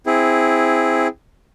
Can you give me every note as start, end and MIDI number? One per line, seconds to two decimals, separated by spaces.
0.06 1.07 60
0.06 1.07 64
0.06 1.07 68